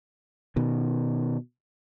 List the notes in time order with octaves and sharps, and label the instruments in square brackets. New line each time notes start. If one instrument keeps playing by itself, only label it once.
[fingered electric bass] B2 D#3